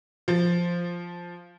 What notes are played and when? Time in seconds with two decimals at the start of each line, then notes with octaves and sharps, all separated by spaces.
0.28 F3 A6